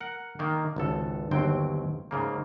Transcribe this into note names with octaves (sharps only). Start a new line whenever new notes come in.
A#4 F#5
D#3 A#3
G#1 C#2 A4
G1 D#2 F#3 C4 G5
G#2 C#3 A#3